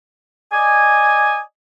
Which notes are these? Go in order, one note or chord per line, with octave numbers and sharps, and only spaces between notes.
D5 D#5 G#5